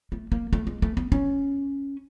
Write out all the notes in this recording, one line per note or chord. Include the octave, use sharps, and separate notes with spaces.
A3
A#3
A3
G#3
A3
B3
C#4